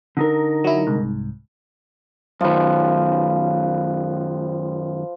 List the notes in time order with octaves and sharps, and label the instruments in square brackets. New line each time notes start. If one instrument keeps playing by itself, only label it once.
[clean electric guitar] D3 D#4 A#4
[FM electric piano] F#3 E4
C2 G#2
[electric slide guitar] F#2 D#3 [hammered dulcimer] F3 B4